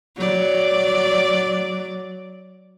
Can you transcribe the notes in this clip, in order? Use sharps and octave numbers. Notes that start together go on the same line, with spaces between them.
F#3 D5